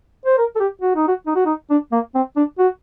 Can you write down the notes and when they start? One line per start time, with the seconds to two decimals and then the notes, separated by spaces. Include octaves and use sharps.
0.26 C5
0.38 A#4
0.56 A4
0.60 G4
0.81 F#4
0.95 D#4
1.08 F#4
1.26 D#4
1.36 F#4
1.46 D#4
1.70 D4
1.92 A#3
2.15 C4
2.36 D4
2.59 F#4